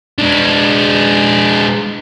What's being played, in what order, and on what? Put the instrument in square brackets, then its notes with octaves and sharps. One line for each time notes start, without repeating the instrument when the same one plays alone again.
[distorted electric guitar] G#3 D4